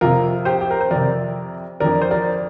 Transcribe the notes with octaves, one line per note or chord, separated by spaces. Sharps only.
F2 C3 F4 A#4
G4 C5
G4
A#4
C5
F2 C3 A#4 D5
F2 D3 A#4 D5
C5
A#4 D5